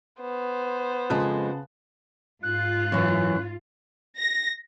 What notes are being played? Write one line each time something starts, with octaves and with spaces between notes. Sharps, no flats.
B3 C5
F2 C#3 G#3 A5 F#6
G#2 F4 F#6
F#2 E3
A#6